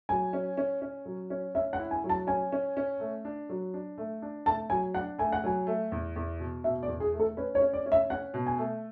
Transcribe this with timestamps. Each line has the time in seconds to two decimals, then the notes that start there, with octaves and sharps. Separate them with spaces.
0.09 F#3 G#5
0.33 C#4
0.57 C#4
0.82 C#4
1.06 F#3
1.30 C#4
1.55 C#4 E5
1.73 F#5
1.79 E4
1.91 G#5
2.04 F#3
2.09 A5
2.27 C#4 G#5
2.52 C#4
2.77 C#4
3.00 A3
3.25 D4
3.49 F#3
3.74 D4
3.98 A3
4.22 D4
4.46 A3 A5
4.70 F#3 G#5
4.94 D4 F#5
5.18 A3 G#5
5.32 F#5
5.44 F#3 G#5
5.67 A3
5.92 E2
6.16 E2
6.40 B2
6.64 B2 E5
6.83 D5
6.88 E2
7.00 G#4
7.14 A3
7.20 A4
7.37 C#4 B4
7.55 C#5
7.61 C#4
7.73 D5
7.86 C#4
7.92 E5
8.10 C#4 F#5
8.34 B2
8.46 G#5
8.58 A3